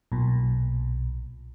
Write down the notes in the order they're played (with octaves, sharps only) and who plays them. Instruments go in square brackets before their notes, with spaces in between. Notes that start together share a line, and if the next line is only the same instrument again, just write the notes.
[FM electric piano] B1 A#2